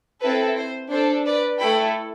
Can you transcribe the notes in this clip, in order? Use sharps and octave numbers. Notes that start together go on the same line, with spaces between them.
C4 E4 A4 B4
C5
D4 A4 C5
B4 D5
A3 E4 A4 G5 B5